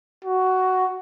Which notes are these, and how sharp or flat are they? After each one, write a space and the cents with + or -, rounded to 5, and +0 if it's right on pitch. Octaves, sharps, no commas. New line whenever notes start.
F#4 +10